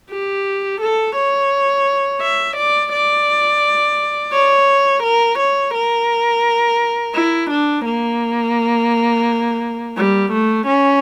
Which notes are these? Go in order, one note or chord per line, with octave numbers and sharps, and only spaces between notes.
G4
A4
C#5
E5
D5
D5
C#5
A#4
C#5
A#4
E4
D4
A#3
G3
A3
C#4